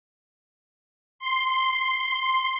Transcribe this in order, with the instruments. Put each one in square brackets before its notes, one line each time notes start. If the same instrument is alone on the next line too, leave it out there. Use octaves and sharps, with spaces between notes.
[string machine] C6